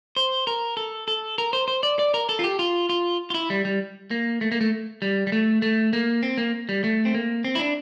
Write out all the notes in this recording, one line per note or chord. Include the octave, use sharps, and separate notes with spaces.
C5
A#4
A4
A4
A#4
C5
C5
D5
D5
A#4
A4
F4
G4
F4
F4
F4
E4
G3
G3
A#3
A3
A#3
A3
G3
G3
A3
A3
A#3
C4
A#3
G3
A3
C4
A#3
C4
E4
D4